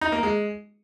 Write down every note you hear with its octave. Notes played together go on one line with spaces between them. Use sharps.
D#4
A#3
G#3